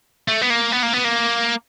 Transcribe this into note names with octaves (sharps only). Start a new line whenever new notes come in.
A3
B3
A#3
B3
A#3
B3
A#3